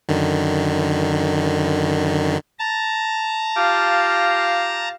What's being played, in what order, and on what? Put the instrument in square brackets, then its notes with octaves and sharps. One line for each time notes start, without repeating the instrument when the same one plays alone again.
[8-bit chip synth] F#2 D3 D#3
[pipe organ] A5 A#5
[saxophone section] F4 G4 F5